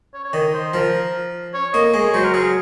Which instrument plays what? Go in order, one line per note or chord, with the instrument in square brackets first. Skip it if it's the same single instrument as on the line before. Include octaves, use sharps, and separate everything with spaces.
[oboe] C#5
C#5
[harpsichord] D#3 [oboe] D#5
[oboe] C5
[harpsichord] F3 [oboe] A#4
[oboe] C#5
[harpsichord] A#3 [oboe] D#5
[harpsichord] G#3 [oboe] C#5
[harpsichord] F#3 [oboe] C5
[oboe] A#4
[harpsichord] F#3 [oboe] G#4